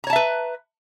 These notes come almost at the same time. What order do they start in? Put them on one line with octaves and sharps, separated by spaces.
A#5 C#5 A5 E5 B4